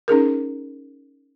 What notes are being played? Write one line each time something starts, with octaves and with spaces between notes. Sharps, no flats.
C#4 D#4 G#4 A#4